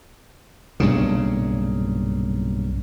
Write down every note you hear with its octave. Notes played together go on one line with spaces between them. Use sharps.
B1 G2 A#2 C#3